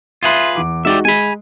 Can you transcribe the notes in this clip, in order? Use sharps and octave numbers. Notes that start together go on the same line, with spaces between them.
F4 G#4 B4 E5 C6
E2 D6
G#3 D#4 F#4 G4 D5 E5
G#3 G#5 B5